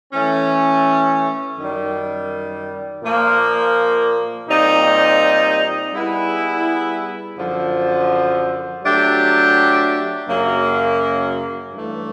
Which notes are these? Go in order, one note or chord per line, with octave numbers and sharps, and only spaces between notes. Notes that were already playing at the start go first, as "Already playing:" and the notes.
E3 A3 C#4
F#2 D#3 G3
A#2 F3 A#3
A#2 G3 C4 D#4
G3 B3 E4 G#4 B4
F#2 D3 F3
F#3 A3 D4 G4
F#2 C#3 F#3 A#3
G2 E3 A3